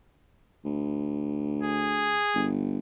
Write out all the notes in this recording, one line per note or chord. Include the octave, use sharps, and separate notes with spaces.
D2
G#4
G1